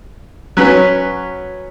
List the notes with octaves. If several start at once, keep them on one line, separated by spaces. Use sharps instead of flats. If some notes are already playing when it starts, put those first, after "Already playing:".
F#3 C#4 B4